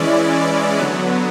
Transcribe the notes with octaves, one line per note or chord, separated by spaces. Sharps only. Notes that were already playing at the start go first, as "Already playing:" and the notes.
Already playing: E3 G#3 C#4 E4 D5
D3 F#3 B3